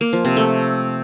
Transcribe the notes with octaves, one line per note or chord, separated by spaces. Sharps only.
A#3
F3
C3
A3